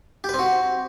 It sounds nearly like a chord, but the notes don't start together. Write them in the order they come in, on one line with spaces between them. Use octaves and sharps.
G4 B4 C4 F#4